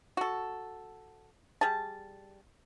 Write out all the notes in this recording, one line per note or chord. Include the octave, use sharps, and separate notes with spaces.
F#4 A4
G3 G#4 A5